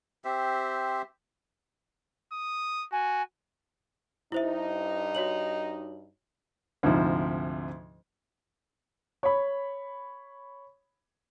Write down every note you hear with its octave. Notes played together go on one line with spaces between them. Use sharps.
C4 G4 C5 E5
D#6
F#4 G#5
G2 D#4 E4 C5 E5
F#4 C#5 F#7
D2 G#2 C3 F3
C#5 B5